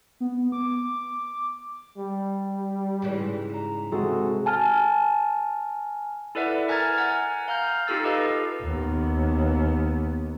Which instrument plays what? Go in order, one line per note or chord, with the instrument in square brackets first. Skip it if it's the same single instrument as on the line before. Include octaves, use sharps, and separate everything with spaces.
[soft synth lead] B3
D6
[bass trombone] G3
[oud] G#2 C#3 E3
[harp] A#5 E7
[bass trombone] C3 [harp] G#3 F#4 A4
[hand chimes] G#5 A5 F6
[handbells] E4 A4 B4 D5 E5 F#5
A#4 G#5 A#5 F6 G#6 A6
F#5 G#5 A#5
F5 A#5 F6 G6
D#4 F4 G4 A4 E6 A6
G4 A4 B4 D#5 F5
[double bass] D#2 B3